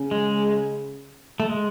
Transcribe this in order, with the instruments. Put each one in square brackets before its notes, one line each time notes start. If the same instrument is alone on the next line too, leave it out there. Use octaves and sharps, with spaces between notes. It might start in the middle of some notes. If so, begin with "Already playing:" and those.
Already playing: [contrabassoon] C#3
[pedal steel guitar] G#3
A3
G#3